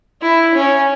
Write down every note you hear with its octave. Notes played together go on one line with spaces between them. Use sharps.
E4
C#4